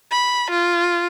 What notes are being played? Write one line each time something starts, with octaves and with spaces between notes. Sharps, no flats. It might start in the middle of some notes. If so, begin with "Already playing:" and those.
B5
F4